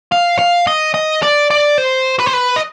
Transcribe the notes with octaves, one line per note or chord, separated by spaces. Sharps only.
F5
F5
D#5
D#5
D5
D5
C5
B4
C5
B4
D#5